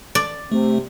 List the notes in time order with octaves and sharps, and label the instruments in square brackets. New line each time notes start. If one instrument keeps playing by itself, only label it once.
[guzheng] D5
[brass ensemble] C3 [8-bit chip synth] A3